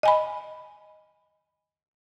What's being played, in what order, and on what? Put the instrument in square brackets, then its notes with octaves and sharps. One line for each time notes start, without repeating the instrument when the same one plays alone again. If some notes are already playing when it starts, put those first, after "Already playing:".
[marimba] D#5 G#5 B5